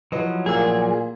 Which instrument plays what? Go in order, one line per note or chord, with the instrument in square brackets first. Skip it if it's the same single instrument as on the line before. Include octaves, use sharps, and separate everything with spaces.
[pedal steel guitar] F3 F#3 [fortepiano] E4 B4 D#5
[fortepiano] A1 A#3 E6 [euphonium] A#2 [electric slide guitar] G#4